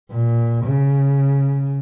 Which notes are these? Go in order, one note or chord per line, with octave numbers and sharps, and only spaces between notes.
A#2
C#3